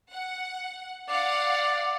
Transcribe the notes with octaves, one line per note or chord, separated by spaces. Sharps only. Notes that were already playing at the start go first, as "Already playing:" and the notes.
F#5
D5 F5 F#5